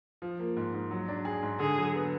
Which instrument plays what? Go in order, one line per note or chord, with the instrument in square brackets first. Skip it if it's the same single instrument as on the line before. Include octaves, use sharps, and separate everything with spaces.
[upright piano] F3
A#3
G#2
G#2
F#3
D4
G#4
G#2
[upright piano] D3 [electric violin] G#4
[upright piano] F#3
B3